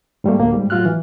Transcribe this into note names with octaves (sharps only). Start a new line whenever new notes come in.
G#2 G3 A3 A#3
D2 A2 A#3
G#2 G3
A2 F#3 F4 F#4 F6 F#6
E3